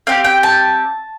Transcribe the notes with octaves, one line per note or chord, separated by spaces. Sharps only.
C4 G4 F5
G5
A5